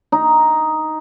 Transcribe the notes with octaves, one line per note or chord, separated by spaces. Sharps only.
D#4